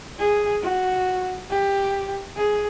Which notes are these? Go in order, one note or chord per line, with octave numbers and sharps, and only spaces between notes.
G#4
F#4
G4
G#4